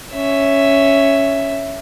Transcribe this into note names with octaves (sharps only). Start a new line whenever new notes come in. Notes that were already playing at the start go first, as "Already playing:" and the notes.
C#4 E5